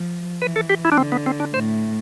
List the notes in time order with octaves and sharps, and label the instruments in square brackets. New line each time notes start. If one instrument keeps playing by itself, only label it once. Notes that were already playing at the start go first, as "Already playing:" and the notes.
Already playing: [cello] F3
[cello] E3 [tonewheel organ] B4
[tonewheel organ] A4
G4
E4
D4
[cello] D3 [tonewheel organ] C4
[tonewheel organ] B3
C4
D4
[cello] A2 [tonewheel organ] C5